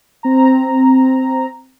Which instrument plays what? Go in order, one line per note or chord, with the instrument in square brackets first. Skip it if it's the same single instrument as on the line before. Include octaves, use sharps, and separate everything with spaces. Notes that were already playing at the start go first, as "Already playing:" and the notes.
[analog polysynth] C4 A#5